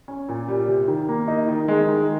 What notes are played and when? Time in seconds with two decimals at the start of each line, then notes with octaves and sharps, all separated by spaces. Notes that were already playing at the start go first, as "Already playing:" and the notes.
0.08 C#4
0.29 A#2
0.48 G3
0.68 C3
0.88 D#3
1.09 A#3
1.28 D#4
1.48 D#3
1.68 G#3
1.88 D#3